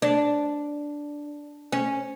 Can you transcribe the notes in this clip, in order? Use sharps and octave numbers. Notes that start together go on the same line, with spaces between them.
D4
C#4